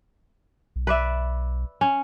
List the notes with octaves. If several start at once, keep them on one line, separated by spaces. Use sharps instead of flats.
B1
B4 D5 E5
C#4